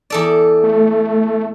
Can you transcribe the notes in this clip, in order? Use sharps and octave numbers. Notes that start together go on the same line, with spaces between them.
E2 A4 D5
A3